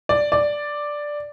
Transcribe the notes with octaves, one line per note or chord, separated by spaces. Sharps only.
D5
D5